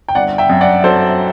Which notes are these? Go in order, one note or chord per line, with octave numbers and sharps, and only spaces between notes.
G5
G1 D5 F#5
E5 G5
F#2
D5 F#5
F#3 A4 C5